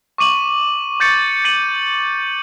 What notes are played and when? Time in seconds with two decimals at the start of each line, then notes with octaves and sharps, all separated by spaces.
0.18 C#6 D6 D#7 F#7
1.00 C#6 G6 A6 C#7
1.45 A6 C#7 D#7 F#7